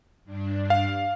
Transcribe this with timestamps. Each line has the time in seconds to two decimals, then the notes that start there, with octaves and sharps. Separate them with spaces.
0.25 G2 D4
0.70 F5